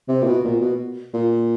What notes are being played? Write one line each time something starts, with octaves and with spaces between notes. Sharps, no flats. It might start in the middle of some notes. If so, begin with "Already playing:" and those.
C3
A#2
B2
A#2
B2
A#2